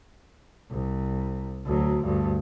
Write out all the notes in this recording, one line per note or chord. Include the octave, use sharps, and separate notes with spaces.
C2
D2 F#3
D2 G2